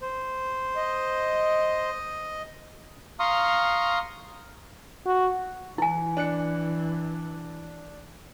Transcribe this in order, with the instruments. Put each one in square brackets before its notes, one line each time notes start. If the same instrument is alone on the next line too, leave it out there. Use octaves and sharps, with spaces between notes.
[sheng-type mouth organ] C5
[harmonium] D#5
[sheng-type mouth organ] F5 A#5 C6 C#6 D#6 F6
[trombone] F#4
[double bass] E3 [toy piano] E4 G#5
[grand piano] D4 F#6 C#7